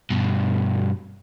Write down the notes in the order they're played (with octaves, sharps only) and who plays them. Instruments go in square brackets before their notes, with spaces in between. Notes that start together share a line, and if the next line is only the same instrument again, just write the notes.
[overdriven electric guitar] G2 B2